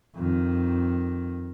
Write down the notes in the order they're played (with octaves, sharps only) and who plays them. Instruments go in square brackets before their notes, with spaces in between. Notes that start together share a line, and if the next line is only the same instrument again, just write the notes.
[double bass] F2 D#3